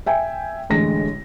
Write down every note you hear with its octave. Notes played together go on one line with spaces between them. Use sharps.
E5 G5 G#5
A1 D3 G#3 A#6